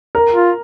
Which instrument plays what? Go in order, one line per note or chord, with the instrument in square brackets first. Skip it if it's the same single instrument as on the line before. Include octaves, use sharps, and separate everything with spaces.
[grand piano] A#4
[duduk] F4